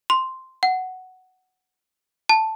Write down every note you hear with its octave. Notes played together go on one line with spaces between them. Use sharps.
C6
F#5
A5